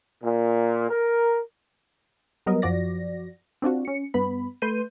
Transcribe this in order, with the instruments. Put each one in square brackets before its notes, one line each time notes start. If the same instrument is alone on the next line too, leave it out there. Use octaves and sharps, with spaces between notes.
[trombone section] A#2
A#4
[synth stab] F#3 G3 B3 A#4 D#5
F#2 F3 F#4 D5 A#6
C4 D4 F4 F#4
C#4 C#7
G2 B3 B5
A3 B4 C6 G6 D#7